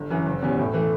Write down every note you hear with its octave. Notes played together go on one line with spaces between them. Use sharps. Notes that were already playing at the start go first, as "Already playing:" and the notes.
Already playing: G1
F#2 E3
F#1
E2 B2 G3 C#4
A2
E3 A3